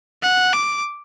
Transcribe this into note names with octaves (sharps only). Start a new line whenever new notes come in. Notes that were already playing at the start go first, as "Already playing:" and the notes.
F#5
D6